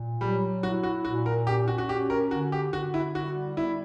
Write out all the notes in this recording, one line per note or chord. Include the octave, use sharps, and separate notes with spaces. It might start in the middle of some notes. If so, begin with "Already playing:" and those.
Already playing: A#2
F#3 G3
E4 F#4
F#4
A#2 F#4
A#4
C#4 G4
F#4
F#4
C#4 G4
A#4
D3 F#4
G4
D3 F#4
E4
G3 F#4
B3 E4